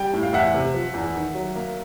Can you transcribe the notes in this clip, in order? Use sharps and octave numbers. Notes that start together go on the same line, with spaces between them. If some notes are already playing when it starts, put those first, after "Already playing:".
Already playing: G3 G5
A2
F5
E2 E5 F#5
C3
F3
E2
D#3
F#3
A#3